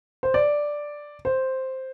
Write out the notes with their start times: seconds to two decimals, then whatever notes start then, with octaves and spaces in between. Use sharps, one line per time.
0.23 C5
0.34 D5
1.25 C5